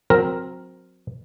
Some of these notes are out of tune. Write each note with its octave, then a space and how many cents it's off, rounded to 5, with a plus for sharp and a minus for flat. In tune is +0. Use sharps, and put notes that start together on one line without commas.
F#3 -30 C4 +0 A#4 +0